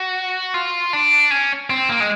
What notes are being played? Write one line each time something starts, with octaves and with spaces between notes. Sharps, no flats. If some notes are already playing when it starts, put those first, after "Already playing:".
Already playing: F#4
F4
D4
C#4
C4
A#3
G#3